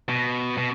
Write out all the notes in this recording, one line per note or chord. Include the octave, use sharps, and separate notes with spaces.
B2
B2